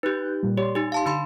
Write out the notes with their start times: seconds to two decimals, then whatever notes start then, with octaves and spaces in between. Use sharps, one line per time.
0.03 D#4 G4 B4 F#6 G6
0.43 A#2 G3
0.58 G4 C#5 D5 C6
0.75 D#4 G4 G#5
0.92 F5 A5 C6
1.06 D3 D#4 B5 C6